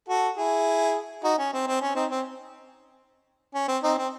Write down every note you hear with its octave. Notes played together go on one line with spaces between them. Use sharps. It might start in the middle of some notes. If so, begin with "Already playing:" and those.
F#4 A4
E4 G#4
D#4 F#4
C#4
C4
C4
C#4
C4 D#4
C4
C#4
C4
C4 D#4
C4